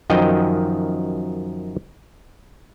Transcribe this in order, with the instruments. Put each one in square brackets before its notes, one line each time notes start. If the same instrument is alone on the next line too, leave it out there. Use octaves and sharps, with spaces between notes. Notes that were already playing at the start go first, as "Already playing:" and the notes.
[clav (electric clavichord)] F#2 D#3 F3 D#5 G5